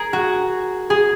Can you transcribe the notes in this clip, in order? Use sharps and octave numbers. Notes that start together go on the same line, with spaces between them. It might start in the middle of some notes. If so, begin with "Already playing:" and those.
Already playing: G#4 A#4
F#4
G#4